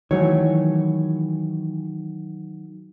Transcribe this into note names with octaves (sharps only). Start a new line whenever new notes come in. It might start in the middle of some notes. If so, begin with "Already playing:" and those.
D#3 E3 F#3 A3 C#5